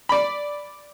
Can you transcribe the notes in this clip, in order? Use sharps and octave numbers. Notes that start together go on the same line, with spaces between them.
D5 B5